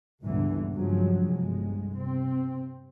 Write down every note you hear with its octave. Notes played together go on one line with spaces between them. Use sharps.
G1 C#2 G2 A#2 D3 E3
G2 C#3 F3 F#3 G#3
G1 C2 G#3
C3 C4